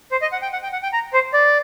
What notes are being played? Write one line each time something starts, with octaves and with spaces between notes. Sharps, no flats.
C5
D#5
F#5
G5
F#5
G5
F#5
G5
A#5
C5
D5